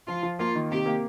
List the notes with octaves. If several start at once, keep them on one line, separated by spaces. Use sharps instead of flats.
F3 F4
F3
A#3 F4
D#3
C3 G4
A#3